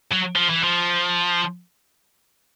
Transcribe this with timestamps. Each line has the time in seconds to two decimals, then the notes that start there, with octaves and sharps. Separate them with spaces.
0.12 F#3
0.36 F3
0.50 E3
0.64 F3